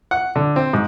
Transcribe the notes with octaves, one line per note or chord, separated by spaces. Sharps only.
F#5
D3
C4
G#2